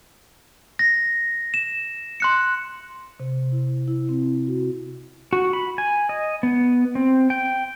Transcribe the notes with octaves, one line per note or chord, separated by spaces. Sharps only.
A#6
E7
C6 F#6 C#7
C3
E4
E4
C4
F#4
F#4
B5
G#5
D#5
B3
C4
G5